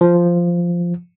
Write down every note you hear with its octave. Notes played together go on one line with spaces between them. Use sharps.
F3